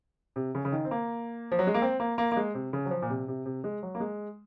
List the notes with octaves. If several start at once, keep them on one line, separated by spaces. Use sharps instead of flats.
C3
C#3
C#3
D#3
C4
A#3
F3
F#3
G#3
A#3
C4
A#3
A#3
A#3
G#3
C3
C#3
F#3
F3
A#2
C3
C3
C3
G#3
F#3
A#3
G#3